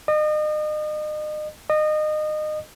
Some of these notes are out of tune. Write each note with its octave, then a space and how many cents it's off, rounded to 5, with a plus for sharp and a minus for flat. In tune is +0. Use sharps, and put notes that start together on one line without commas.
D#5 -35
D#5 -25